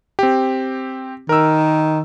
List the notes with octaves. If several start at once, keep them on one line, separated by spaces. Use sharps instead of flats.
C4 G4
D#3 A#4 E6